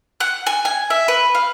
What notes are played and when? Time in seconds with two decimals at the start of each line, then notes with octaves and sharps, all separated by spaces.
0.20 F#5
0.47 G#5
0.65 G#5
0.90 E5
1.08 B4
1.35 F5